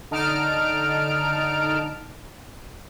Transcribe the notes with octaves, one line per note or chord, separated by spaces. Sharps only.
D3 D#4 A5 F6 D7